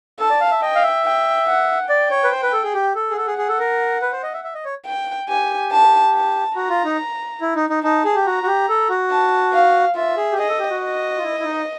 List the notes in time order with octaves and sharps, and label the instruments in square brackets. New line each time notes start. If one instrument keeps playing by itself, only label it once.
[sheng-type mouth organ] A4 [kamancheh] A5
[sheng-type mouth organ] D5
F5
E5
[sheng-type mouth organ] D#5 [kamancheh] G5
[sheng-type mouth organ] F5
E5
[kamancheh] G5
F#5
[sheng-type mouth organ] D5 [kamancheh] G5
[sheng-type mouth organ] C#5
B4
C5
B4
A4
G#4
G4
A4
G#4
[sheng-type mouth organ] A4 [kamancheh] F#5
[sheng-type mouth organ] G#4
G#4
A4
A#4
B4
C5
D#5
E5
E5
D#5
C#5
[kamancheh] G5
[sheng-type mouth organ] G4 [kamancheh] G#5
[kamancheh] A5
A5
[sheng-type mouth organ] F#4 [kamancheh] A#5
[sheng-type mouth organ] F4
D#4
E4
D#4
D#4
[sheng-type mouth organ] D#4 [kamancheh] A5
[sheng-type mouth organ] G#4
G4
[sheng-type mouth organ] F#4 [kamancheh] A#5
[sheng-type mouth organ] F#4
G4
A4
F#4
[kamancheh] A5
F5
[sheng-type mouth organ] F4 [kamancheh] E5
[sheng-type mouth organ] G#4
G4
[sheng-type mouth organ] G#4 [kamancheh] D#5
[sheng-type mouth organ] A4
G4
F#4
[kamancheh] D#5
[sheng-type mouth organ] F4
E4
E4
D#4